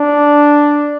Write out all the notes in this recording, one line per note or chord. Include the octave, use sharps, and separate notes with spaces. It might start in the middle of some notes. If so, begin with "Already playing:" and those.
Already playing: D4